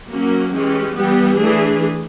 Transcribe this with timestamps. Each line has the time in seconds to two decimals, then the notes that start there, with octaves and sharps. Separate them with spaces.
0.10 F#3 A#3 C#4 F#4
0.53 E3 G#3 C#4 G4
0.95 E3 G3 B3 G4
1.38 E3 A3 D4 G#4